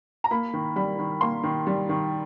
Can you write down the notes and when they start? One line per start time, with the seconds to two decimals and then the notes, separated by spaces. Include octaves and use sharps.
0.24 A#5
0.31 A#3 B5
0.53 D#3
0.76 G3 B5
0.99 D#3
1.21 A#3 C6
1.43 D#3
1.67 G3
1.89 D#3